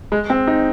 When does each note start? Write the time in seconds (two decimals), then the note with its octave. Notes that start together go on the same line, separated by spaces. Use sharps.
0.12 G#3
0.30 C4
0.47 D#4